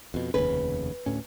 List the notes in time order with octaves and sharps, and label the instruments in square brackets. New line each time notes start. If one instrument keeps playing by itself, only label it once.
[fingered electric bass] F2 B2
[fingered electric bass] F1 D#2 C#3 [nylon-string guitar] B4
[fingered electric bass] D2 A2 C#4